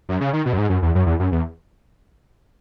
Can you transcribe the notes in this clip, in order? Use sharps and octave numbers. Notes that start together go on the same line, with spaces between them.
F#2
C#3
D#3
B2
F#2
G#2
F#2
E2
F#2
E2
F#2
E2